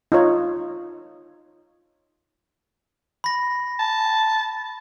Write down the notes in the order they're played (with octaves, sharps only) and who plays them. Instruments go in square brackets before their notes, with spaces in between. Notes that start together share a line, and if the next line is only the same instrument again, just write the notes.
[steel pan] D#4 F4 C#5
[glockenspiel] B5 A#6
[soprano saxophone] A5